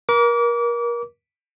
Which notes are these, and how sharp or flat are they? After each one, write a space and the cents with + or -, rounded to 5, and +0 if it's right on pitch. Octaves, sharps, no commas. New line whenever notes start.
A#4 +30 D6 -30